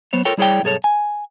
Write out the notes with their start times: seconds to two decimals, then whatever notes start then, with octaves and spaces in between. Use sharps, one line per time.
0.13 F#3 B3 C5 C#5
0.25 F4 A4 A#4 C#5 G5
0.38 G3 E4 G#4 C#5 D5 G5
0.63 B1 G2 G#4 A4 C#5
0.84 G#5